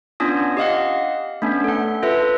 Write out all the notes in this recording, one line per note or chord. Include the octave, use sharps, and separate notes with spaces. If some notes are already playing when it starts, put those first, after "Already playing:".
B3 C#4 D4 F4 D#6
G4 D#5 F5 F#5
A3 B3 C#4 D4
A4 F#5
F4 A4 B4 E5